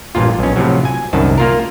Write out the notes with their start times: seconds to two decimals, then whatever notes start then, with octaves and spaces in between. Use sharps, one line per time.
0.15 A1 G2 A#2 F4
0.39 B1 C#4
0.56 A2 C3 F3 F#3
0.85 G#5
1.13 C2 F#2 D#3 A5
1.38 A#3 F4 A#4